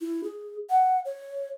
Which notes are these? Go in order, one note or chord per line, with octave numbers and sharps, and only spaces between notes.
E4
G#4
F#5
C#5